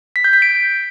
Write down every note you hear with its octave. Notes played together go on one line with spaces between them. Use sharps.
B6
G6
B6
D7